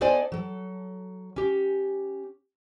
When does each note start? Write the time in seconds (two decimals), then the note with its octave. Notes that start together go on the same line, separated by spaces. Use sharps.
0.01 B3 D#4 A4 C5 D5 G#5
0.32 F#3 A4
1.36 C#4 G4